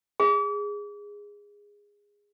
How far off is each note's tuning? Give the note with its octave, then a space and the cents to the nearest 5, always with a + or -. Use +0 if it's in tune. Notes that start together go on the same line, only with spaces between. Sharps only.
G#4 -15